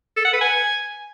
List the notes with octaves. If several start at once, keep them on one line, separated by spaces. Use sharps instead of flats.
A4
F#5
B4
G#5